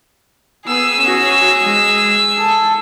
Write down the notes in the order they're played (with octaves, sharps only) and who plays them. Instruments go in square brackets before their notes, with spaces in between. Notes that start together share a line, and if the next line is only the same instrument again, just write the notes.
[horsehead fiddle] B3 [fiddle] G#4 E6
[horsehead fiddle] C#4 F#4
G#3
A4